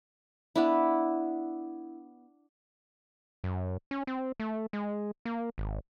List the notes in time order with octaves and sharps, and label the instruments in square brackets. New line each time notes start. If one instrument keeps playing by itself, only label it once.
[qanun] B3 D4 E4
[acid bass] F#2
C#4
C4
A3
G#3
A#3
G#1